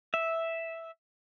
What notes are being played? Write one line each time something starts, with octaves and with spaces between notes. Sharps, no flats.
E5